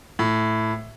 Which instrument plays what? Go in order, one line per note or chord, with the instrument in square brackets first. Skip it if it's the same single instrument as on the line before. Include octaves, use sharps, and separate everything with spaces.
[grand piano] A2